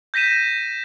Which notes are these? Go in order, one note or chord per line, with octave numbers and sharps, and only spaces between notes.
G6 A#6 B6 D#7 E7